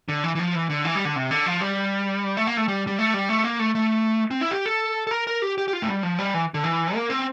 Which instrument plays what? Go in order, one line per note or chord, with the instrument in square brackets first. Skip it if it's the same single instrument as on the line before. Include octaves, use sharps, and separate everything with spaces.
[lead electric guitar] D3
E3
E3
F3
E3
D3
E3
G3
D3
C3
D3
F3
G3
A3
A#3
A3
G3
G3
A3
G3
A3
A#3
A3
A3
C4
E4
G4
A4
A4
A#4
A#4
G4
G4
G4
F4
A3
G3
F3
G3
E3
D3
E3
A#3
C4